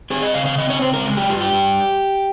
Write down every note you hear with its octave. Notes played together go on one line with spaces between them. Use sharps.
C4 G#4
D#5
C#3 F5
F5
C4 D#5
C#5
C#3 C5
A#4
G#3
G4
G2 F4
G4
G2